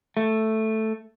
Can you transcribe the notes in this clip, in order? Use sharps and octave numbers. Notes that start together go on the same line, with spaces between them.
A3